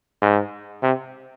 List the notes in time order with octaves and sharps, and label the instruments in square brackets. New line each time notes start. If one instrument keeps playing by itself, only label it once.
[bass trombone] G#2
C3